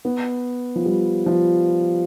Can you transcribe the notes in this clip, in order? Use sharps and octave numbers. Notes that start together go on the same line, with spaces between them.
B3
F3
G3
F3